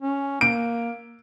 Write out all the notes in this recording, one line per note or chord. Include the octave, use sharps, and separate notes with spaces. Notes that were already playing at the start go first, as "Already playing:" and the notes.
C#4
A#3 D7